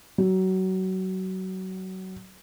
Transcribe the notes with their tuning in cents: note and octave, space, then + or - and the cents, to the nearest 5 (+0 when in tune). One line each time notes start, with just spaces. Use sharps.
F#3 +25